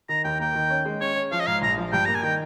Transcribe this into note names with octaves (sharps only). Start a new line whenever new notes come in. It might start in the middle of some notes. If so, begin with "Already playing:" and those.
D#3 A#5
D#2 G5
A#3 G5
D#3
C#4
G#3
C#4 C#5
C#4
F3 F5
D#5
G#2 F5
A#1 A#5
F3
G2 G5
A#3 A#5
G#5
D#3 G5